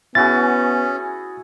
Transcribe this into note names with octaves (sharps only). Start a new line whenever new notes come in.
B3 C#4 E4 F#4 G#4 A6